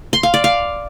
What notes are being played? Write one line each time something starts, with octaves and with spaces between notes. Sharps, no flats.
C6
F5
D5
F5